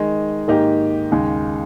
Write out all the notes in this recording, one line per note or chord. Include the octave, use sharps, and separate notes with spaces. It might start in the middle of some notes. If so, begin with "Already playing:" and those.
Already playing: D#3 G#3 D#4
G#2 D#3 A#3 D#4 G4
D#2 C#3 G#3